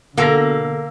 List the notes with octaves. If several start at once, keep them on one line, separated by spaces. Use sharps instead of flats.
B2 D3 A#3 F#4 A4 E6 A#6